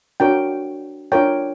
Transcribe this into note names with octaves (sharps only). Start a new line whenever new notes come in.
D4 F#4 A#4 C#5 G5
D4 F4 A#4 C#5 G5